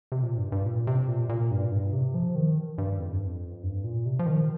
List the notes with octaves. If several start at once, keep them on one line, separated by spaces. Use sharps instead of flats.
C3
A#2
G2
G2
A#2
C3
A#2
A#2
G2
A#2
G2
C3
F3
D#3
G2
F2
G2
F2
G2
A#2
C3
F3
D#3